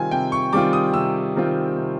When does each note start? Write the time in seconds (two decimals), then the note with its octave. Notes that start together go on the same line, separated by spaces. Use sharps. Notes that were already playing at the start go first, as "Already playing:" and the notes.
Already playing: C3 D#3 G3 C4 F4 G#5
0.11 C3 G5
0.32 C#6
0.52 D#3 G3 C4 F4 D6
0.73 D#6
0.94 C3 E6
1.36 D#3 G3 C4 F4
1.78 C3